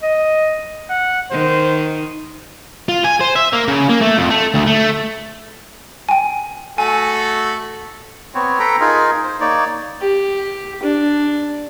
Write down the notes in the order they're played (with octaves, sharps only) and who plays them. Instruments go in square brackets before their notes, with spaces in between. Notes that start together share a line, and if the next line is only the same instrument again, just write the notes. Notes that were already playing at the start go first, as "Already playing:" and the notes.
[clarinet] D#5
[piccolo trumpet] F#5
[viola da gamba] D#3 [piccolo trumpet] C5
[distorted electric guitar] F4
G#5
C5
E5
A#3
C#3
A#3
A3
F2
A3
D2
A3
[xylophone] G5 G#5
[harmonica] A3 F#4 A4 [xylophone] G#5
[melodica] B3 C4 C#5
A4 B4 G5 A#5
D#4 F4 G#4 A#4
C5
A#3 D#4 C#5 D5
[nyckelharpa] G4
D4